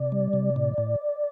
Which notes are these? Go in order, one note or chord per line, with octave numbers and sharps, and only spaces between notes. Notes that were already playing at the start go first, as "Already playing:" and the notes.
Already playing: C3 D5
G3
C3
A2
A2